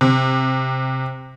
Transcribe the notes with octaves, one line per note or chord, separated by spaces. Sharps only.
C3